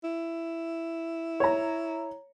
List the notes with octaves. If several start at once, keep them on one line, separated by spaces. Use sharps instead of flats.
E4
C#5 A#5